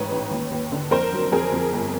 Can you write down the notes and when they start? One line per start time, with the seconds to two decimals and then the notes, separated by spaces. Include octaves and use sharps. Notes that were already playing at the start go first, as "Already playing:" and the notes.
Already playing: A1 G#2 B4 C#5
0.12 A1
0.31 D#2
0.51 D#2
0.72 D3
0.91 F2 A#4 C5
1.12 F#3
1.32 F2 G#4 A#4
1.52 F2
1.72 G1